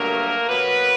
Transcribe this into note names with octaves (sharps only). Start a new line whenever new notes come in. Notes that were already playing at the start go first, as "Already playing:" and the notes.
Already playing: G2 D3 F#3 A3 A#3 D4 A#4
B2 F#3 A#3 B3 B4